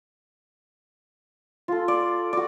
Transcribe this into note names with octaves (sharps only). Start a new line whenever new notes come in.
F4 A4
D5
F#4 D5